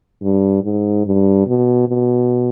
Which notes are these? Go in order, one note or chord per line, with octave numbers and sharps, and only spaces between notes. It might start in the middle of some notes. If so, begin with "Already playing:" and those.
G2
G#2
G2
B2
B2